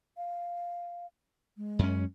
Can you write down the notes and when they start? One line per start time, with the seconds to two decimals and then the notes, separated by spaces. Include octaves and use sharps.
0.17 F5
1.57 G#3
1.79 F#2 C#4